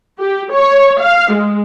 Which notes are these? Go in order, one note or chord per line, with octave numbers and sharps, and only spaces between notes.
G4
C#5
F5
G#3